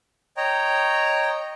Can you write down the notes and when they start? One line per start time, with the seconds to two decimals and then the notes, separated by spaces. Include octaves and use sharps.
0.37 C#5 D#5 G5 A#5